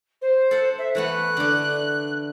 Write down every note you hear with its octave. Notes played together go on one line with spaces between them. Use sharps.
C5
A4 F#5
E5
E3 A3 B3 F#6
D3 D4